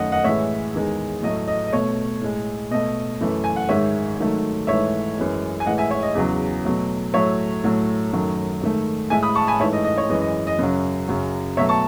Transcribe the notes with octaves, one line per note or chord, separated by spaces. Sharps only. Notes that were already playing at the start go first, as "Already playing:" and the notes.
Already playing: F#2 D#3 A3 D#5 F#5
D#5 F#5
A2 E3 G#3 C#5 E5
E2 D#3 G#3
A2 F#3 A3 D#5
D#5
D#5
B2 A3 C#5
A2 G#3
B2 A3 D#5
F#2 E3 A3
G#5
F#5
G#2 D#3 G#3 C#5 E5
G#2 D#3 F#3 A3
G#2 E3 A3 C#5 E5
F#2 E3 G#3
G#5
A2 E3 G#3 D#5 F#5
E5 G#5
C#5 E5
D#5
E2 C#3 F#3
B2 F#3 A3
A2 F#3 A3 C#5 E5
A2 F#3 A3
F#2 D#3 F#3 A3
G#2 D#3 A3
A2 G#3 E5 G#5
B5 D#6
A5 C#6
G#5 B5
G#2 E3 A3 C#5 E5
D#5
D#5
C#5
F#2 E3 G#3 D#5
D#5
D#5
F#2 C#3 F#3
F#2 C#3 F#3
B2 F#3 A3 C#5 E5
A5 C#6